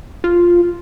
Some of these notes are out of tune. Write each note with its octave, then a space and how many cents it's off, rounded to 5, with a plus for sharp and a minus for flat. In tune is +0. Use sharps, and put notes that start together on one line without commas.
F4 +0